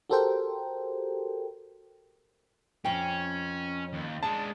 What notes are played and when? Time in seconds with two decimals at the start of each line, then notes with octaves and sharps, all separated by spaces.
0.10 F#4 G4 A4 A#4 C5 G5
2.85 F2 C#4 G5
3.93 D#2
4.23 G#3 D4 A5